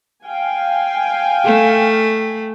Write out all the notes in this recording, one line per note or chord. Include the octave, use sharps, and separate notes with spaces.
F5 G5 G#5
A3